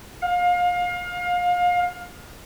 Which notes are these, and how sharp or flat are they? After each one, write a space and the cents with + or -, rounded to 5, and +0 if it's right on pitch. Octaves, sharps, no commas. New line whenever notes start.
F5 +30